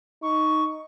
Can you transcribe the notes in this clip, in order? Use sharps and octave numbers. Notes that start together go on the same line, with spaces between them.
D#4 C#6